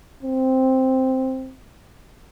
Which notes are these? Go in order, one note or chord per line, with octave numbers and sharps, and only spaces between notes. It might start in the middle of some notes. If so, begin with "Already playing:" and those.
C4